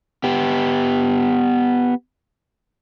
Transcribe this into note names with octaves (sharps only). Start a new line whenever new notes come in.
B3 G4